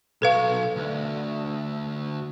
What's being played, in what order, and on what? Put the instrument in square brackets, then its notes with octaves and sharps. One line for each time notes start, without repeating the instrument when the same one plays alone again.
[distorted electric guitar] B1 C#5 [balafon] A4 B4 F5
[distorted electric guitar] D2